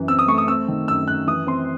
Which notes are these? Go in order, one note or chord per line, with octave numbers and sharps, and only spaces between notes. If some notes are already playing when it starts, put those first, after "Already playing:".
Already playing: F#2 E3
C4 E6
D#6
A3 C#6
D#6
C4 E6
D#3
F#2 E6
F#2 F#6
E3 D#6
C4 C6